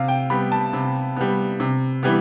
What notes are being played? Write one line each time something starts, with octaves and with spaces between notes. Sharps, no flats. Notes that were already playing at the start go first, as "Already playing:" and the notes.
Already playing: C3 F5
G5
G3 B3 B5
A5
C3
G3 B3
C3
E3 G3 B3